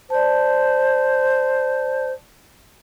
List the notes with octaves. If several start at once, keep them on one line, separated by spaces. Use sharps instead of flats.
C5 D5 A5